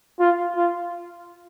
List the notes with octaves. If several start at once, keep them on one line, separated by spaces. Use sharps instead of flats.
F4
F4